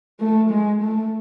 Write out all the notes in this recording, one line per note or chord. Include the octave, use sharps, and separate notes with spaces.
A3
G#3
A3